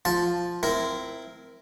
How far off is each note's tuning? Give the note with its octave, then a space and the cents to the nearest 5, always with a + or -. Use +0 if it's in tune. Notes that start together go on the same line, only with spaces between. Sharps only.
F3 +0 F4 +0 A5 +0
C4 -20 E4 +0 A#4 +0